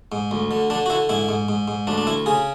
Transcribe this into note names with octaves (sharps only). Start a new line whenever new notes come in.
G#2
D2
D3
D3 D4
F#4
D3 E4
G#2 E4
G#2
G#2
G#2
D2 D4
D4
D2 E4
C#3 G#4